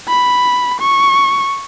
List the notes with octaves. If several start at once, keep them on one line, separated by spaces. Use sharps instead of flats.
B5
C#6